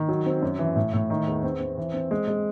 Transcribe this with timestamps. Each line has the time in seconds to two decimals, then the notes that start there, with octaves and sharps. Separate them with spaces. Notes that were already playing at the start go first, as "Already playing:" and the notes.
Already playing: D#3
0.08 F#3
0.26 C4
0.42 F#2
0.59 E3
0.76 A2
0.93 A2
1.10 D#3
1.27 E2
1.43 C4
1.60 C4
1.77 E3
1.94 C4
2.11 G#3
2.28 G#3